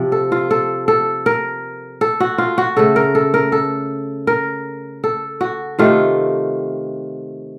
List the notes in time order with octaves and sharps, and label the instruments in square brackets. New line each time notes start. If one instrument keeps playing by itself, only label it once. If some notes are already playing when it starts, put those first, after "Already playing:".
Already playing: [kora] C3 F3
A4
F4
A4
A4
A#4
A4
F#4
F4
F#4
C#3 A3 A4
A#4
A4
A#4
A4
A#4
A4
F#4
C3 D#3 A3 F4